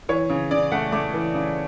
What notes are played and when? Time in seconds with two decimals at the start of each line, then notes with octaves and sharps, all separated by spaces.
0.09 E3 C#5
0.30 C#3
0.51 C#3 D5
0.72 A3 F#5
0.92 A3 D6
1.13 E3
1.34 C#3